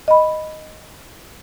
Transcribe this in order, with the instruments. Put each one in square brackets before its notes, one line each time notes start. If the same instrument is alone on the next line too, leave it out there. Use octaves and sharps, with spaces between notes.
[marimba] D#5 B5